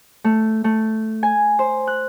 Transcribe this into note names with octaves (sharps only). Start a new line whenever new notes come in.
A3
A3
G#5
C5
F#6